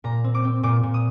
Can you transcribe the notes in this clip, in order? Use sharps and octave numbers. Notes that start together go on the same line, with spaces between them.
A#2 A#5
C4
D6
C4
A#2 D6
A#2
D#6